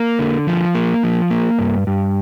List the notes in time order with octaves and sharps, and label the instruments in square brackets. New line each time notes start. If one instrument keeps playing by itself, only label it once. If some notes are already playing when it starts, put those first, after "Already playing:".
Already playing: [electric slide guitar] A#3
D3
F3
A#3
F3
A#3
G2
G2